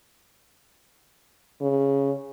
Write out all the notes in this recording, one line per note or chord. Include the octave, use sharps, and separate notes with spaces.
C#3